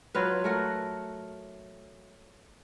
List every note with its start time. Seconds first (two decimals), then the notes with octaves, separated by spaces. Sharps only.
0.15 F#3 F4 B4
0.44 A3 A#4 F#5